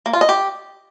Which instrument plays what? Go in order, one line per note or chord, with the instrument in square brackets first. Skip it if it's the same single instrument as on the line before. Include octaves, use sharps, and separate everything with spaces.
[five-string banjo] A#3
F4
D#5
G4